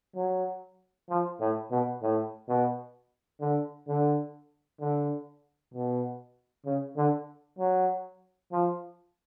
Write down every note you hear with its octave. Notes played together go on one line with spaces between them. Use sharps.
F#3
F3
A2
B2
A2
B2
D3
D3
D3
B2
C#3
D3
F#3
F3